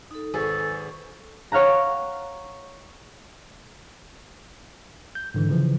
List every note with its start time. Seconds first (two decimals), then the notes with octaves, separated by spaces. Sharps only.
0.11 D#4 A4
0.34 G#1 G#4 A4 B4 C#6
1.52 C#5 F5 F#5 A#5
5.15 G6
5.34 G#2 D3 E3
5.49 C#3 E3 F3